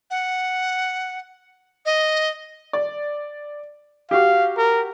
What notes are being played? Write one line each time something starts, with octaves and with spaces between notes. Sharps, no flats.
F#5
D#5
D5
F#4 G4 F5
A#4